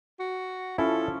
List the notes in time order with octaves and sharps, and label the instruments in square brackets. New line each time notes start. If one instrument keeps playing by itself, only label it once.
[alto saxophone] F#4
[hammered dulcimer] F3 C#4 [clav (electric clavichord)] E4 [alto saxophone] A4